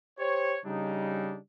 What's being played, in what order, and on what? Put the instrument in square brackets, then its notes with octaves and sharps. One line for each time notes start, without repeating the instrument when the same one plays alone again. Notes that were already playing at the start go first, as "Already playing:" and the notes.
[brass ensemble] G4 C5 C#5
C#3 G3 D4 D#4